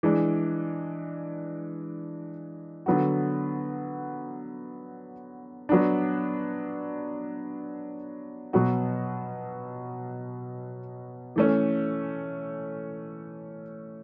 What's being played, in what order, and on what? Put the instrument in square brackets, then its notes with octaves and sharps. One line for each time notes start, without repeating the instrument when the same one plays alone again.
[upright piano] E3 G#3 D4
D3 F#3 B3 F#4
F#3 B3 D4
B2 F#3 B3 F#4
E3 A3 C#4